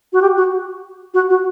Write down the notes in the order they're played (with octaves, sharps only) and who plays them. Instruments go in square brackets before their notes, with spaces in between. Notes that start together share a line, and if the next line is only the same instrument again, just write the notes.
[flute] F#4
G4
F#4
F#4
F#4